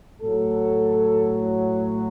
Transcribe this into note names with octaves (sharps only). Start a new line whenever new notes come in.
A2 F#3 A4